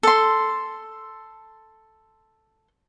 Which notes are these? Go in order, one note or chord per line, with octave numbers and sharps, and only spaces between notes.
A4 C6